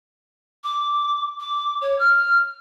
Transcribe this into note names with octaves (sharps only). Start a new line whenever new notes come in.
D6
D6
C#5
F6